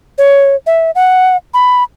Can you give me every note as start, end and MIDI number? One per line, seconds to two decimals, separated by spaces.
0.18 0.56 73
0.67 0.91 76
0.95 1.37 78
1.54 1.84 83